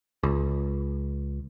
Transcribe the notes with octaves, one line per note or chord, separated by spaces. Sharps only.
C#2